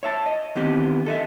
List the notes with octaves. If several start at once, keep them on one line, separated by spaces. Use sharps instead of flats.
C#5 E5 A5
D#5
D#3 E3 B3 C4 G4
A4 D#5 E5